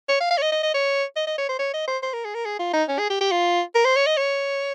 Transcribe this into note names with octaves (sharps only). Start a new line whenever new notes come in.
C#5
F5
F5
C#5
D#5
D#5
D#5
C#5
D#5
D#5
C#5
C5
C#5
D#5
C5
C5
A#4
G#4
A#4
G#4
F4
D#4
C#4
G#4
G4
G4
F4
A#4
C5
C#5
D#5
C#5